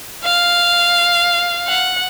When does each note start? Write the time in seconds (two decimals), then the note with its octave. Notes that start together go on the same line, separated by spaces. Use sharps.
0.24 F5
1.67 F#5